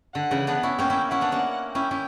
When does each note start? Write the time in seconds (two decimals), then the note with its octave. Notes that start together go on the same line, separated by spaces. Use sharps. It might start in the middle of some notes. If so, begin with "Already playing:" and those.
0.15 D3 F#5
0.31 C#3 E3
0.47 B3 D4
0.63 C#4 E4
0.79 A#3 C#4 G5
0.90 C#4 E4
1.11 C#4 E4 F#5
1.21 B3 D4
1.32 A#3 C#4
1.75 C#4 E4 G5
1.91 C#4 E4